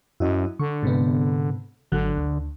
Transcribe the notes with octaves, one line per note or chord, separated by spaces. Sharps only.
F#2 E4 F#4 D#5
D3 C#6
G#2 C3 B3
G#1 D3 F#3 F#6
D2